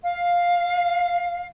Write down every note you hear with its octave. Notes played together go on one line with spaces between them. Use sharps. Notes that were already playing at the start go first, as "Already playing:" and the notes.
F5